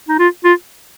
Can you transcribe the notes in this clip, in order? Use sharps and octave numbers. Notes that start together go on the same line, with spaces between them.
D#4
F4
F4